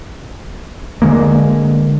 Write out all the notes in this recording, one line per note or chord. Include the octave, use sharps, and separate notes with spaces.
D3 E3 G#3 A#3